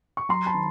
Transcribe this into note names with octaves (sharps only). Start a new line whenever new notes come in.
C#6
F#3 A#5 C6
A5 B5
D#3